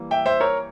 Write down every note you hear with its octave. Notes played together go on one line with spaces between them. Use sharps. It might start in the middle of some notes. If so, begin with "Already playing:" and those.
Already playing: E3 G3 A#3
E5 G5
C5 E5
A#4 C#5